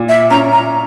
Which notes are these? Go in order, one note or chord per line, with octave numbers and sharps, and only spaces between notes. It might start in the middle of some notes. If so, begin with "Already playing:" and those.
Already playing: A#2
E5
C#4 A#5
A#5